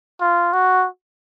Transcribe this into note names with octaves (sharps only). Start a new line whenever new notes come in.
F4
F#4